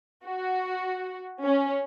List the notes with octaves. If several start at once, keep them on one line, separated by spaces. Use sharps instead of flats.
F#4
C#4